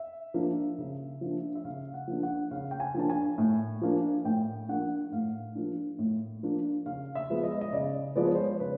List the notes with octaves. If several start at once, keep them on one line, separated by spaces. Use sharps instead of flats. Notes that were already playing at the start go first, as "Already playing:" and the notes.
Already playing: E5
F3 A#3 D4
C#3
F3 A#3 D4
E5
C#3 F5
F#5
F3 A#3 D4
F#5
C#3 F5
G5
G#5
F3 A#3 D4 A5
G#5
A2
F3 A#3 D4
A2 G5
F3 A#3 D4 F#5
A2 F5
F3 A#3 D4
A2
F3 A#3 D4
C#3 F5
E5
F3 G#3 B3
D#5
E5
D#5
C#3 D5
F3 G#3 B3 D5
C#5
C5
C#5
C#3 B4